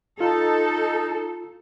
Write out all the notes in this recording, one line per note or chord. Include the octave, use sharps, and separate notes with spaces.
D#4 F4 A4